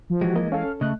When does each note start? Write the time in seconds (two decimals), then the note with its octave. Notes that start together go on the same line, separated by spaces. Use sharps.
0.10 F3
0.21 E3 G#3 F#4 G4
0.36 A#3 D#5
0.52 C#4 A4 F5
0.81 C#3 A3 D#5 F#6